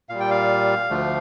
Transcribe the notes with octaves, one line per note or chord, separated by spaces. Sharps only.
A#2 G3 F5
G5
F5
D2 D3 F3 A3